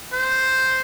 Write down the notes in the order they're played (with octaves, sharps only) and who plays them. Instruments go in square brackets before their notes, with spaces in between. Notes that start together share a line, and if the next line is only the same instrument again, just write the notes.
[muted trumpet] C5